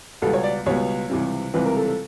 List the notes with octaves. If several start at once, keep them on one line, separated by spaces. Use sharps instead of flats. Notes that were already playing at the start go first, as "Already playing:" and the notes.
C#2 B2 G3 B3 A4
C#5
D5
C#2 B2 G3 B3 C#5
C#2 C3 E3 G3 C4
C#2 C3 E3 G3 C4 B4
A#4
A4
A4